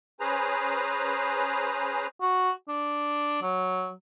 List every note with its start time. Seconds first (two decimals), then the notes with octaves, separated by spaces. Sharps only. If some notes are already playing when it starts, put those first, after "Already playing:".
0.20 C#4 G#4 B4 C5 A#5
2.22 F#4
2.68 D4
3.42 F#3